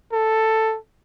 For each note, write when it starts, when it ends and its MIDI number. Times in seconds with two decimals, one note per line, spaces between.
0.13 0.77 69